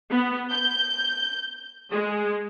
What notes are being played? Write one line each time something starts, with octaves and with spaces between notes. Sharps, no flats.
B3
G6
G#3